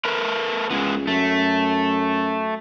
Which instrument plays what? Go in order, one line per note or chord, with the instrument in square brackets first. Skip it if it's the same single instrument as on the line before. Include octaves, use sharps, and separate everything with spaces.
[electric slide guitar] A3 A#4 B4
[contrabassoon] C#2 [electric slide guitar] G#3 B3
[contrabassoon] F#2 [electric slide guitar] A3